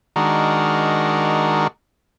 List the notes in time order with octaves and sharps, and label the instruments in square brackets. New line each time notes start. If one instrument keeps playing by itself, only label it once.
[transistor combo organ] D#3 G#3 D4 F#4 A#4